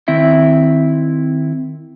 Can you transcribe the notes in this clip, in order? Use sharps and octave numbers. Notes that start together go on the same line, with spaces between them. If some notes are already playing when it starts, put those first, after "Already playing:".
D#3 C4 E4 E5